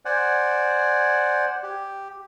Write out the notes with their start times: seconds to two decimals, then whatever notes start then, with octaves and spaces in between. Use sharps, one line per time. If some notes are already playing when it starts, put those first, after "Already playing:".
0.05 C5 D5 F#5 G#5
1.63 G4